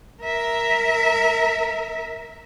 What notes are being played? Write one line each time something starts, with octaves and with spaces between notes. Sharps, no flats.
A#4 E5